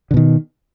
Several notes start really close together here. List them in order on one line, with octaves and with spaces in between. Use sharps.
D3 B2 D#3